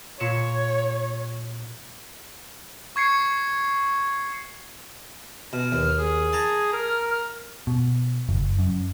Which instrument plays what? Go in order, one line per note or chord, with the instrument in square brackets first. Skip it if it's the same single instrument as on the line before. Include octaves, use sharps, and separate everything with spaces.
[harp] A#2 C#7 E7 [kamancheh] C#5
[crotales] C#6 G#6 C7 C#7
[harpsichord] B2 [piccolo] F6
[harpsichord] D#2
[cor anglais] G#4
[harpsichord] A5 A#5 [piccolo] G#6
[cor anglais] A#4 [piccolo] F6
[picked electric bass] B2
F#1
F#2